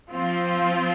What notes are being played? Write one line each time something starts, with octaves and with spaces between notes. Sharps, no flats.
F3 C4 F4